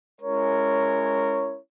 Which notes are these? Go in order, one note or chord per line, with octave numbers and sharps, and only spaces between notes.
G#3 C#4 E4 A#4 C#5